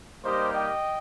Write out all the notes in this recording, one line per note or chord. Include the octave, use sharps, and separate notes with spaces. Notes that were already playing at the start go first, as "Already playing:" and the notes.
G3 A#3 D#4 G4 C5 D#5
D#5 G5